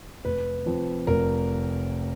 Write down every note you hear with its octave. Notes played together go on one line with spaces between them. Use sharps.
F1 B4
F2 F3
F1 A#4